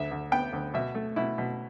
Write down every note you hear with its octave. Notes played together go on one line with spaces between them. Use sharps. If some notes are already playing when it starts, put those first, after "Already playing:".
Already playing: D2 E5
D2
B3 G5
D2
B2 E5
A3
B2 E4
B2